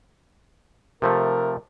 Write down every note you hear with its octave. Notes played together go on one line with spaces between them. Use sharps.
C3 F3 A3 A#4